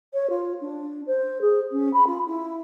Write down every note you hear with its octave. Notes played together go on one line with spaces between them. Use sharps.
C#5
F4
D4
C5
G#4
C#4
B5
F4
E4